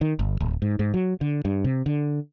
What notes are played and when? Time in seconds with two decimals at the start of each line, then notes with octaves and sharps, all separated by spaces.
0.01 D#3
0.19 G1
0.40 D1
0.62 G#2
0.79 G#2
0.94 F#3
1.21 D3
1.45 G2
1.64 C3
1.86 D3